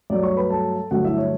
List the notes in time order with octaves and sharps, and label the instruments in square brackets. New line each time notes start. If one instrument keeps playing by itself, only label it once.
[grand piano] G2 F#3 A3 D5
C#5 C#6
B4 B5
A4 A5
G2 D3 F#3 A3 F#4 F#5
E4 E5
C#5